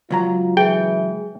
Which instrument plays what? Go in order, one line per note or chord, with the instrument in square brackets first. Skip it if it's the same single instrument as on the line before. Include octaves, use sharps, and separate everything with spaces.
[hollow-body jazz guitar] C#2 F#3 A#5 [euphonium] F4
[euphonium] E3 [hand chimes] G#4 [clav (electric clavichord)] G5